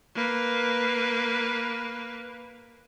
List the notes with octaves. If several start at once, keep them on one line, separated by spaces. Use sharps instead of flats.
A#3 B4